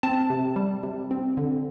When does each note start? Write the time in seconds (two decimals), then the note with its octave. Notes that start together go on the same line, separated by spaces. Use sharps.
0.03 C4 A5
0.30 C3
0.56 G3
0.83 C3
1.11 C4
1.37 D3